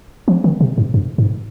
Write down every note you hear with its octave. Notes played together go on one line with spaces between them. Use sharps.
F3
D#3
C3
G#2
G2
G#2